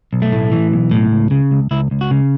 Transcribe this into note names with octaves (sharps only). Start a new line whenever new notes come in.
B1
A3
A2
E3
B1
A2
C#2
C#3
C#2
C#2 E4
C#2
F#4
C#3